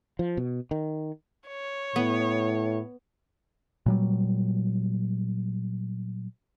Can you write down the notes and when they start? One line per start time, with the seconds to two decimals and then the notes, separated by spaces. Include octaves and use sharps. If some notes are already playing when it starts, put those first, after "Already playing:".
0.19 F3
0.37 B2
0.71 D#3
1.47 C#5
1.96 A2 B3
3.86 A#2 F#3 G3